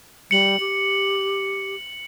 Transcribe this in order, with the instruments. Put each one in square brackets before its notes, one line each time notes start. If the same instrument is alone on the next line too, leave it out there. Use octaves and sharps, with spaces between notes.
[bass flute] G3 [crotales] C#7 F#7
[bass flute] G4